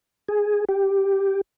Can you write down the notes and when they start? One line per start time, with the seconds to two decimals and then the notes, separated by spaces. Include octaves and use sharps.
0.28 G#4
0.69 G4